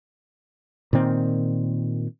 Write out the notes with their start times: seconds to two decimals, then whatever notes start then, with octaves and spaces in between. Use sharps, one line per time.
0.93 A#2 D#3 C4